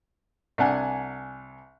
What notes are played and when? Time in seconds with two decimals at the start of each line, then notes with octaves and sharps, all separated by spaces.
0.58 C2 D4 F#5 G#5